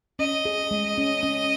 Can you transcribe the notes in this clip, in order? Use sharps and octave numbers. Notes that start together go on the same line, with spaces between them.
C#4 D#5
G#4
G#3
C#4
C#4